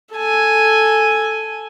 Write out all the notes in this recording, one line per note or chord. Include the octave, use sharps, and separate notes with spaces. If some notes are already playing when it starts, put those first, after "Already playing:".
A4 G#5